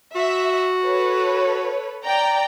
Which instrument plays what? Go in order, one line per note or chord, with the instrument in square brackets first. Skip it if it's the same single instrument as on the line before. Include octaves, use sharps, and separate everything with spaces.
[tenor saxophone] F#4 [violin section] E5
[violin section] A4 B4 C#5
D5 G5 A#5